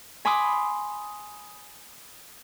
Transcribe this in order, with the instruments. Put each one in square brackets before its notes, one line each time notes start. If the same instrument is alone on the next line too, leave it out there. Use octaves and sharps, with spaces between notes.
[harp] G#5 B5 C6 D6 D#6